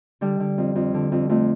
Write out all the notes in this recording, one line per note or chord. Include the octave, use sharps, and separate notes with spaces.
D3 G3
D3
F2
F2
D3
F2
F2 A3